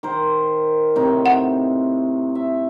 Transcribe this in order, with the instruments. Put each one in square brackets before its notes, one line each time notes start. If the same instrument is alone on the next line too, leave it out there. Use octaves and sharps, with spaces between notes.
[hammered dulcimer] D#3 A#4 C5
A2 C3 D#4
[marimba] F#5
[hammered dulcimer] E5